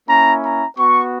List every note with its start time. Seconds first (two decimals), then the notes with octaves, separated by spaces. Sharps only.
0.09 A#3 C#4 E4 A#5
0.43 A#5
0.78 B3 F#4 C#6